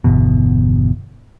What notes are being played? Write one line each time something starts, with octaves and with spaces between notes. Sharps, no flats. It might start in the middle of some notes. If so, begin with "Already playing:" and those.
G1 E2 B2